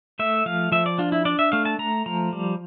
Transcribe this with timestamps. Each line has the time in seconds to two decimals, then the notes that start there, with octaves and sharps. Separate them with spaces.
0.19 A3 E5
0.46 F3 F5
0.72 F3 E5
0.86 D5
0.98 D4 F4
1.12 E4
1.25 D4 D5
1.39 E5
1.52 A3 F5
1.65 A5
1.79 A3 A#5
2.06 F3 A#5
2.33 G3